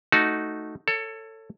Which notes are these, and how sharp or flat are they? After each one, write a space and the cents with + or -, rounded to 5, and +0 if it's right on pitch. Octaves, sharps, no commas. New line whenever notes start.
A3 +0 D#4 +0 F#4 +0
A4 +20 C#5 +0